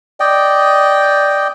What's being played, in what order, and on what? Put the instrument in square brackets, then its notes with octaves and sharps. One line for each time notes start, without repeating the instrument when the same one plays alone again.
[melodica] D5 D#5 G5